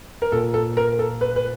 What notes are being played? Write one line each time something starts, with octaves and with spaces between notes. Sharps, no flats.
A#4
A#2 A4
A4
A#4
A4
B4
B4